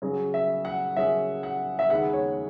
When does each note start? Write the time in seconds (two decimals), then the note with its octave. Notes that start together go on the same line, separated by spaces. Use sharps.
0.02 C#3 F#3 C#4 G#4
0.34 E5
0.65 F#5
0.96 C#3 F#3 C#4 G#4 E5
1.43 F#5
1.79 E5
1.90 D#2 C#3 G#3 B3 F#5
2.13 C#5